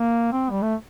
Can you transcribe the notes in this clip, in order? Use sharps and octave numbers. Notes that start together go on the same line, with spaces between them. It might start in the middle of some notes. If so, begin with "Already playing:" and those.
Already playing: A#3
C4
G3
A3